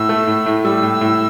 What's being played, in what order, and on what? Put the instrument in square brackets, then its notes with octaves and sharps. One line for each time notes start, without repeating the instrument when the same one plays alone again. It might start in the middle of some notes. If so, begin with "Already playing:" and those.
Already playing: [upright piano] A2 [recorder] E6
[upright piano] A3
A2
A2
[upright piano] G3 [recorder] E6
[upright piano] A2
A2